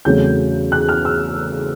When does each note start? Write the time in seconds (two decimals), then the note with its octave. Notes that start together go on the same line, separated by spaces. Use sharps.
0.05 E2 C#3 F#3 A3 C4 G6
0.72 F#6
0.89 F6
1.05 E6